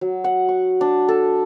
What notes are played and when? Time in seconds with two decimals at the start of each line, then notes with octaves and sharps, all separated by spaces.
0.01 F#3
0.24 F#5
0.49 C#6
0.81 D4
1.09 A4